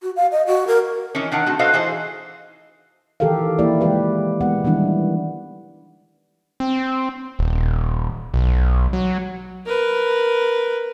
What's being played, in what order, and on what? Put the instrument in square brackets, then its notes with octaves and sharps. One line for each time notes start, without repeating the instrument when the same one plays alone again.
[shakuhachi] F#4
F5
D#5
F#4
A#4
[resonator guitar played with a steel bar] D#3 E3 C#4
D#3 D4 D#4 F#5
A3 C4 F#4
F#4 A4 B4 C5 D#5 F5
E3 D#4 G#4 C5
[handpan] D#3 E3 G4 A4 A#4 F5
F3 A#3 E4 G4 D5
C#3 E3 G#3 G4 B4
G#3 B3 F#5
D#3 E3 G3 D4 E4
[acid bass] C4
D#1
B1
F#3
[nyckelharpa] A#4 B4